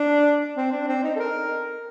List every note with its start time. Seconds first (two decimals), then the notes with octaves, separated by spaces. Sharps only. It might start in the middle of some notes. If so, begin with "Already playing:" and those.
Already playing: D4
0.57 C4
0.72 D4
0.88 C4
1.04 D#4
1.16 A4
1.20 A#4